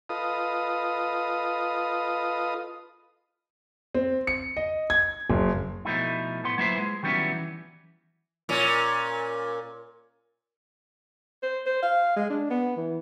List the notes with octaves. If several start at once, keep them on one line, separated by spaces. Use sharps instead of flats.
F4 A4 B4 D#5 F5 D#6
C4
C#7
D#5
G#6
F#1
B2 F3 A3 D#4 E4
A2 B3 C6
F#3 A#3 E4 F4 B4 C5
G#3
D#3 F#3 G3 B3 C#4 E4
E3
A#2 C#4
C5
C5
F5
G#3
D4
B3
E3